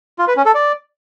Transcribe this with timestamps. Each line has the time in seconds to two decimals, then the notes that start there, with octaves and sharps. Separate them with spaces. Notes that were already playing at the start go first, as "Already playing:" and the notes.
0.19 F4
0.28 B4
0.37 C#4
0.46 A4
0.54 D5